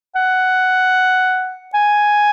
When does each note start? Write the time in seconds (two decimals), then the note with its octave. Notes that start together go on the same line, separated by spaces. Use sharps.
0.16 F#5
1.74 G#5